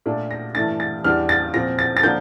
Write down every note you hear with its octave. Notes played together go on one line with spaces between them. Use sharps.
A#2 A3 D4
A#6
G2 E3 A3 D4 A6
A6
E2 E3 G3 D4 F6
A6
A#2 F3 C4 A#6
A6
A6
D3 F3 A#3 D4 G6